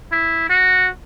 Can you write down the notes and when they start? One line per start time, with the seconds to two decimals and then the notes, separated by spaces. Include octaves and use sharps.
0.12 E4
0.50 F#4